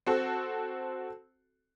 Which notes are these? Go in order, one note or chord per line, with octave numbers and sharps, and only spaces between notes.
C4 F#4 A4